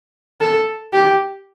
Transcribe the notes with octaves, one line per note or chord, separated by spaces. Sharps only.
A4
G4